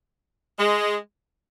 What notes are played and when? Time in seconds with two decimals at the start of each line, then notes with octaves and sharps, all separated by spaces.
0.59 G#3